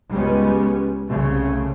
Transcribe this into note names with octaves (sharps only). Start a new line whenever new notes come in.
C#2 G3 G#3 B3 C#4
C2 C#3 A3